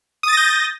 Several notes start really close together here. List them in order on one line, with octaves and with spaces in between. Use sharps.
D#6 A6 A#6 G6